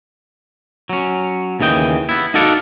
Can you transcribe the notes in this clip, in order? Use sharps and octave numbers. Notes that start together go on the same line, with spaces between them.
F#3 C#4
D#2 C#3 E3 D#5 G5
B3 E4
D#4 F#4 A4 D5 F5 F#5